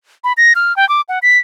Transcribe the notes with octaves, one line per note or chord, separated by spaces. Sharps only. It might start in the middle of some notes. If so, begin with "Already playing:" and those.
B5
A#6
F6
G5
D6
F#5
B6